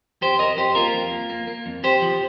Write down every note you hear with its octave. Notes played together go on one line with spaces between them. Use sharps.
F2 G4 C5
F2 A#4 D#5
F2 G4 C5
A#3 F4 A#4
F2
A#3
A#3
A#3
F2
F2 G4 C5
F3